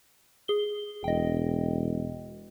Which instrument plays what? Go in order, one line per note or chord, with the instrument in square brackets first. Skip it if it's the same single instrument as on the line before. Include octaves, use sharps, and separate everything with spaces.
[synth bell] G#4 G7
[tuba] E1 [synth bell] D#5 G5